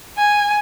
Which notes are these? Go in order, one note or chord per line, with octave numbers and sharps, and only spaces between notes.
G#5